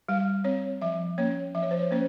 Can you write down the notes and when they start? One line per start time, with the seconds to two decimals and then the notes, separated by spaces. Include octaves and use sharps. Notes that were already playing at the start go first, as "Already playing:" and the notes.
0.09 G3 F5
0.44 C4 C#5
0.81 F3 E5
1.18 A#3 C#4 C#5
1.55 F3 E5
1.62 C#5
1.71 C5
1.79 C#5
1.91 A#3 C#4 C5